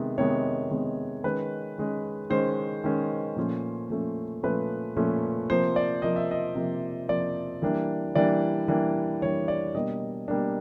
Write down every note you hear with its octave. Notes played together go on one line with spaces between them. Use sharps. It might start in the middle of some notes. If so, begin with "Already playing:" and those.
Already playing: C3 D#3 G#3 B3
C3 D#3 G#3 B3 C#5
C3 D#3 G#3 B3
D#3 G#3 C#4 B4
D#3 G#3 C#4
D#3 G#3 C#4 C5
D#3 G#3 C#4
A#2 F3 A3 C#4
A#2 F3 A3 C#4
A#2 F3 A3 C#4 B4
A#2 F3 A3 C#4
C3 F3 A#3 C5
D5
C3 F3 A#3 D#5
E5
D#5
C3 F3 A#3
C3 F3 A#3 D5
E3 G3 A#3 D4
E3 G3 A#3 D4 D5
E3 G3 A#3 D4
E3 G3 A#3 D4 C#5
D5
B2 G3 A#3 D4 D#5
B2 G3 A#3 D4